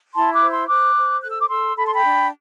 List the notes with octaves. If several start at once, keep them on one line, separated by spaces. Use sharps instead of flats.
E4 A5 C6
D6 F#6
C5
C6 E6
C5 D6 F#6
C5
A4 F#6
E6
D6
A4 C6 E6
A4 B5
C6
G5 B5
D4